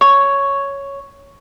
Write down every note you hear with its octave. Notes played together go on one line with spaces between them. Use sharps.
C#5